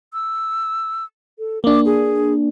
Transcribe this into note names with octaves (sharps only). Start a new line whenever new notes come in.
E6
A4
A#3 D4 D6
G#4